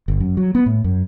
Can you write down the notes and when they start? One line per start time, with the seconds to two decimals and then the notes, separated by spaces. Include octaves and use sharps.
0.08 G1
0.20 F#2
0.37 F#3
0.55 B3
0.66 A2
0.84 F#2